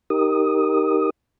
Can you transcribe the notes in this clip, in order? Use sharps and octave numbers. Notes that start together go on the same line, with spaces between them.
D#4 G4 A#4 D#6